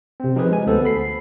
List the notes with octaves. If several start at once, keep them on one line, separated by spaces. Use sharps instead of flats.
C3 C4
F3 D#4 F4 G4 G#4 B4
G#3 G#5
D2 B3 A4 C5
B5 C7